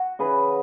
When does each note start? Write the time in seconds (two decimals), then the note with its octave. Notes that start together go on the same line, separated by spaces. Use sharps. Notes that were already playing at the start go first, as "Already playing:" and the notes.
Already playing: F#4
0.19 C#3 E3 G#4 B4